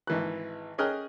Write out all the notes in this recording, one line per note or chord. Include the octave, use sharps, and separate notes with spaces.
G#1 E3 F#6
C#4 G#4 D#5 G5 F6 F#6